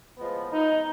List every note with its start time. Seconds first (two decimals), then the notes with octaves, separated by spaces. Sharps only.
0.18 A2 F3 G#3 B3
0.52 D#4